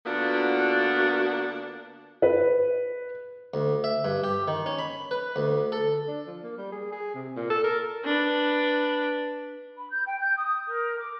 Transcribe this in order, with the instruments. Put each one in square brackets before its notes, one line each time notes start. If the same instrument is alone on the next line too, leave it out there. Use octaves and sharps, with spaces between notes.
[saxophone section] D3 A#3 B3 D4 F4 F#4
[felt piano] B4
[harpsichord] D2
E5
G2
G4
D#3
C#4
B5
B4
D2
A4
[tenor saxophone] D4
F3
A#3
G3
G#4
G#4
C3
A#2
A4
A#4
[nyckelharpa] D4 B4
[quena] B5
G6
G5
G6
D#6
A#4
D6